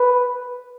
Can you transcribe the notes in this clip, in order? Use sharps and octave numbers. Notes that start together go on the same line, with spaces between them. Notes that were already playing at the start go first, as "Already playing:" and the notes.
Already playing: B4